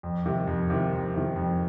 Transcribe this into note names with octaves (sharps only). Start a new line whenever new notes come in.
F2
C3 D#3
F2
C3 D#3
F2
C3 D#3
F2